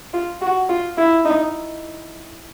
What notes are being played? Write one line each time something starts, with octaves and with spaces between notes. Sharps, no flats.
F4
F#4
F4
E4
D#4